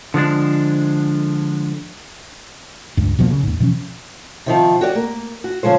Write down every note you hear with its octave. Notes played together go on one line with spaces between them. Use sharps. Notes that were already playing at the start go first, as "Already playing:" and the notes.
D3 F3 G#3 D4
C#2 G2
B2 F3 G3 A#3
C#3
D#2 G#2
B2 E3 F3 C#4
C3 D#3 F3
F#4 G4 D5
A#3
F#4
C#3 F3 G#3 C5